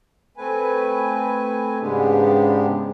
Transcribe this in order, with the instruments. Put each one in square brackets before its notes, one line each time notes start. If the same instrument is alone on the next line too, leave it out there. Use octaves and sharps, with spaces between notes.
[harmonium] A3 C4 B4 G#5
G#2 C#3 G#3 B3 D4 G4